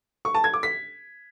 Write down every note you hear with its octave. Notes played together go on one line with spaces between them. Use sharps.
C#6
A5
G#6
D6
B6